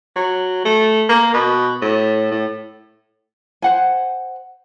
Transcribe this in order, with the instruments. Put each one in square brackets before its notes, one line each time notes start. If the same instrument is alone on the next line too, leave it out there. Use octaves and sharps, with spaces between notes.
[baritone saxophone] F#3
A3
A#3
B2
A2
A2
[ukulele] C5 F#5 G#5